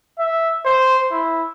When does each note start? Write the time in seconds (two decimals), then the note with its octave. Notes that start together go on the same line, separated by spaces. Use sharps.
0.19 E5
0.65 C5
1.11 E4